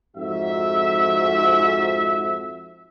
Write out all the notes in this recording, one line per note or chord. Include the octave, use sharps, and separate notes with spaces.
F2 G#2 F#4 E5